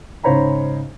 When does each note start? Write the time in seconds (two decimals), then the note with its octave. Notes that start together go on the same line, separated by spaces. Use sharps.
0.23 G#2 C#3 C5 C#5 A#5 B5